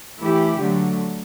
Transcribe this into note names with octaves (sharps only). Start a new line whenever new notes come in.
E3 A3 E4 G4
D3 F#3 A3